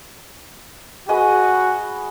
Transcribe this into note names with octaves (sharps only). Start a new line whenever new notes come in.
F#4 G#4 B4 D#5